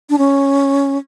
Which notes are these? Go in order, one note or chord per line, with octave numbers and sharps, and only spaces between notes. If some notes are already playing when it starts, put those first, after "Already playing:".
D4
C#4